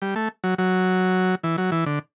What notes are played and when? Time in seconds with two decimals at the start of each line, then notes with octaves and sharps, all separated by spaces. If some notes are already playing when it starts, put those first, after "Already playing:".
0.02 G3
0.16 A3
0.44 F#3
0.58 F#3
1.44 E3
1.58 F#3
1.72 E3
1.86 D3